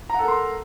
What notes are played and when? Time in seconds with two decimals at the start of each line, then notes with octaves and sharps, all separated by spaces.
0.10 A#5
0.14 F#5
0.19 A4
0.23 A#4
0.28 C6